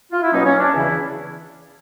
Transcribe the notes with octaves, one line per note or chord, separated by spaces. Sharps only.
F4
E4
B2 F#3 A#3 C#4 D#4
C#4
D4
E2 C#3 E3 E4